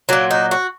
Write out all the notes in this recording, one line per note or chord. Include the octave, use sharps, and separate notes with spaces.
A#2 F#3 A#3
D#4
F#4